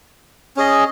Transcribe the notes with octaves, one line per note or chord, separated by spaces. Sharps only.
C#4 G#4 D#5